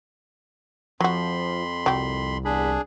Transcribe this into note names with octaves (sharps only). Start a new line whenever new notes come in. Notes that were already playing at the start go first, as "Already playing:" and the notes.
F2 F3 F#3 F#4 B5 C6
C2 F#3 G4
E2 D4 G#4 B5